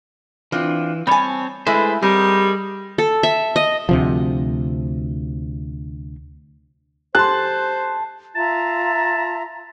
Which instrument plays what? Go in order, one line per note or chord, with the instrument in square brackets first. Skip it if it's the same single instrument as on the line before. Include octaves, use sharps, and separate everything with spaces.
[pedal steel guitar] E3 [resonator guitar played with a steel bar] C4 D4 F4
[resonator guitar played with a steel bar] G3 G#5 [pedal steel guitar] C4 C#5 A5
[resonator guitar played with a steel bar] G#3 A3 E4 [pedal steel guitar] G#4 B4 C5
[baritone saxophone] G3 [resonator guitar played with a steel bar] C4 [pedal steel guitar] G#4 A#4 D#5
[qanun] A4
E5
D#5
[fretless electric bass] D2 C3 F3
[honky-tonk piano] G4 C6 [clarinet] C5 [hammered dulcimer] A5 [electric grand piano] F#6
[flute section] F4 E5 A#5 [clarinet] A5